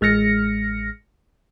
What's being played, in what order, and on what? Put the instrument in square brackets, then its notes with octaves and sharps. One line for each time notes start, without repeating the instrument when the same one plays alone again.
[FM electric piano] A1 G#3 F6 A#6 C#7